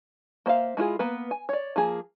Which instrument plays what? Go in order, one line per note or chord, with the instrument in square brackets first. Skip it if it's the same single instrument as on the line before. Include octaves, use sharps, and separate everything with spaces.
[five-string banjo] A#3 C5 E5 F5
G#3 E4 F4 G#4
A#3 B3 B4
G#5
C#5 D5
F3 A#3 G#4